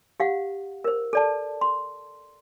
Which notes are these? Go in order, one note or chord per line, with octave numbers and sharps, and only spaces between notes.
G4 F5 F#5
A#4 C5
A4 D5 A5
C6